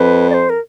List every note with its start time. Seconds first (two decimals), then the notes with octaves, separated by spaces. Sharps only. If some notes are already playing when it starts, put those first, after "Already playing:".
Already playing: F2 B4
0.30 D5
0.34 C5
0.50 A#4